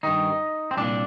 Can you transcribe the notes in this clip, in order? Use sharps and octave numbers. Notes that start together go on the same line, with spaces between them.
G2 D#3 D#4
C4
C2 A#2 D4